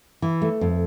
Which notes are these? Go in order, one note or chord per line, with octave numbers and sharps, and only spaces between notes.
E3
A3
F2